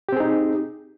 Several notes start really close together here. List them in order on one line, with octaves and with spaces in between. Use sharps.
G4 C4 G#4 D#4